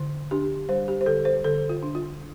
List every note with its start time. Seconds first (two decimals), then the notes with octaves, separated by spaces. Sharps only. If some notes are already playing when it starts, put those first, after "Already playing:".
Already playing: D3
0.31 D4 G4
0.69 G3 C5
0.88 G4
1.01 C5
1.06 D3 A4
1.25 C5
1.44 D3 A4
1.69 F4
1.83 D4
1.95 F4